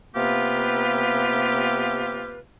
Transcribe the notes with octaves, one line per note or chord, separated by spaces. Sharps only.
C3 A#3 B3 F4 G4 B4